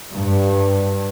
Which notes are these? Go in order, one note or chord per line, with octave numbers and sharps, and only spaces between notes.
G2